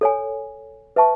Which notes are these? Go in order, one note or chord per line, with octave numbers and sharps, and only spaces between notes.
A4 C#5 G#5
B4 E5 A5 C#6